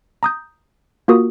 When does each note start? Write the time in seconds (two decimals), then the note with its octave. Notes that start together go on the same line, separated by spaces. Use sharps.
0.23 A#5 D#6 G6
1.08 A#3 F4 F#4 A#4 D#6